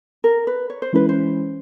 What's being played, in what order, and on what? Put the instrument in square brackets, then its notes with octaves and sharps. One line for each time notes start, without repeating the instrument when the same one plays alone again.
[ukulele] A#4
B4
C#5
C5
[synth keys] E3 G#3 C#4 E4 [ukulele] B4
[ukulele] C5